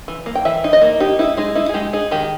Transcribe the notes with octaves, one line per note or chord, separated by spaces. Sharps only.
E3
A#3
G5
E3 E5
D#4
D#5
A#3
D#4 G4
D#4 E4
G#3 D#4
D#4 E4
G#4
G#3 G4
D#4 G#4
D#3 G4